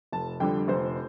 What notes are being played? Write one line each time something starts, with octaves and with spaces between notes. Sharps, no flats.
F1 A5
F2 D3 G3 G5
F1 C5